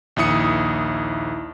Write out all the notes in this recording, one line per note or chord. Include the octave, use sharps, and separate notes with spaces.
A#1 D#2 E4 D#6 C#7